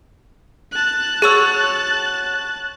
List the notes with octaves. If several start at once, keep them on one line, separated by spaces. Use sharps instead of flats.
A5 F#6
F#4 G#4 C#5 E6